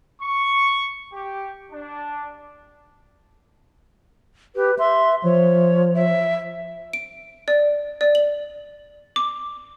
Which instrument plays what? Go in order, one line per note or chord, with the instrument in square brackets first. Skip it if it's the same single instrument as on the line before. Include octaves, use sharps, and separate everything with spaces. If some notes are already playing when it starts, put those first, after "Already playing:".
[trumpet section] C#6
G4
D4
[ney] G4 [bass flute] B4
[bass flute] E5 [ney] C6
[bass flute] F3 [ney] C#5
[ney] E5
[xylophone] D7
D5
D5
F#7
D6